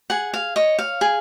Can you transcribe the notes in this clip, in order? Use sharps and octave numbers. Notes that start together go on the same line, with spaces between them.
G#4 F#5
F5
C#5 D#5
F5
G#4